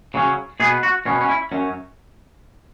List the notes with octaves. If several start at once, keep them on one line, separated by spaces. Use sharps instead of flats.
C#3 F#3 C#4
B2 B3 G#4
F#4
B2 B3 C#4
C#4
E4
F#2 F#3 C#4